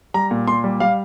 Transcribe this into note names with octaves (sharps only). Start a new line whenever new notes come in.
G3 A#5
A#2
A#2 C6
G3
G3 F5